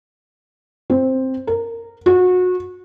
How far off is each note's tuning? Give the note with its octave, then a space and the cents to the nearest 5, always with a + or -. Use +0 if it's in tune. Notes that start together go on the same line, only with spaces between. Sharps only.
C4 +5
A#4 -15
F#4 -25